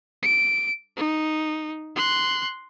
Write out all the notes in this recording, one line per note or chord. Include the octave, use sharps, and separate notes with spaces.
D7
D#4
C6 F#6